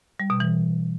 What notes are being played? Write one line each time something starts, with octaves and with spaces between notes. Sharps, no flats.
G3
B2
E3